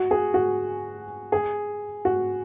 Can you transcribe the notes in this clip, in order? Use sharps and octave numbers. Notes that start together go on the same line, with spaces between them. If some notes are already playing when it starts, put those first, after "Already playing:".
Already playing: F#4
G#4
F#4
G#4
F#4